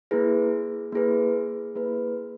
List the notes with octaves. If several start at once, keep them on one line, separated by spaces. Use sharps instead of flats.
A#3 E4 G#4 B4
A#3 E4 G#4 B4
A#3 E4 G#4 B4